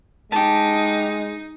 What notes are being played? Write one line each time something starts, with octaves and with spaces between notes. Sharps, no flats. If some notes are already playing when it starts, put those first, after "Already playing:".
G#3 D#4 G4 A5